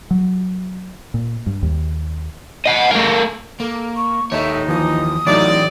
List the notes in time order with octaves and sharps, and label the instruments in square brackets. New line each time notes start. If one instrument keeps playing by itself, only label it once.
[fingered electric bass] F#3
A#2
G2
D#2
[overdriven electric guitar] D#5 F#5
A3 A#4
[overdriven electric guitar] A#3 [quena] A4
[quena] C#6
[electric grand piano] D#2 [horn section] D#4 [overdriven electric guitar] A4 C#5 [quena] E5
[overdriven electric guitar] D#2 [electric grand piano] E3 F3 [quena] D#6
[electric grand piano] A2 F#3 D#4 [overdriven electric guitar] E3 A3 [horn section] D5